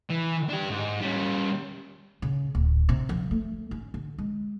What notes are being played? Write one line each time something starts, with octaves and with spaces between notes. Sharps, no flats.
E3
D4 G4
G#2
G3 C#4
C#3
D1
C3
F3
A3
C#4
D3
G#3